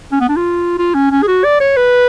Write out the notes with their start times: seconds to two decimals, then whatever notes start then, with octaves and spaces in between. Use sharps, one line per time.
0.12 C#4
0.21 B3
0.29 D4
0.37 F4
0.78 F4
0.95 C#4
1.11 C#4
1.23 G#4
1.28 F#4
1.44 D5
1.61 C#5
1.77 B4